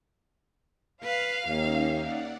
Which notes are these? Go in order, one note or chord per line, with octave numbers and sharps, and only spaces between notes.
B4 F5
D#2 A#3 C#4 D#4 E5
D5 F#5